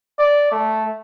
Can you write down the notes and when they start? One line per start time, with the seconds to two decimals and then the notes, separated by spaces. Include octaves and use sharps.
0.19 D5
0.52 A3